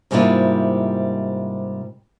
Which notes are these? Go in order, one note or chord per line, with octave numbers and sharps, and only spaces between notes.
G#2 C3 G3 A#3 E4 F4